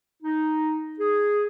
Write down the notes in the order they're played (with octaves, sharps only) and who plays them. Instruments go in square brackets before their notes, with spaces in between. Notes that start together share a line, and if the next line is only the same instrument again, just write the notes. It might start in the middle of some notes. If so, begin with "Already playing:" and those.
[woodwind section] D#4
G#4